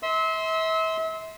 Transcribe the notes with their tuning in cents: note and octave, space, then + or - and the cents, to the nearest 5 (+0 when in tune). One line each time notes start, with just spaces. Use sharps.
E5 -35 C6 +0 E6 -30